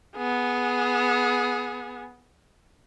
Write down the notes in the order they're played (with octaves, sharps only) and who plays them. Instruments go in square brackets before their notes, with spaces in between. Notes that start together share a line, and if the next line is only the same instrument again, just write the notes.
[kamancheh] B3 G#4